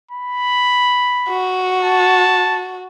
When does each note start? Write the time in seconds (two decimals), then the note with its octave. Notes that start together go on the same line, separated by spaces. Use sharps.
0.11 B5
1.29 F#4
1.84 A5